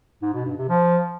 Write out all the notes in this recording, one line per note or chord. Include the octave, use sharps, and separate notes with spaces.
G#2
B2
G2
C3
F3